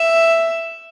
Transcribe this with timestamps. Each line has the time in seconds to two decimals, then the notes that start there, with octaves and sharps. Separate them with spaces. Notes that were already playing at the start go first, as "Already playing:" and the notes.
Already playing: E5